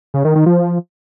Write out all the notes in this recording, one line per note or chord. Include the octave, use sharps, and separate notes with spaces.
C#3
D#3
D#3
F3